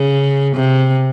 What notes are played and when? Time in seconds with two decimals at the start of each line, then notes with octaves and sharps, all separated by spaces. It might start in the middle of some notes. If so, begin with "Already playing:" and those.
Already playing: C#3
0.55 C3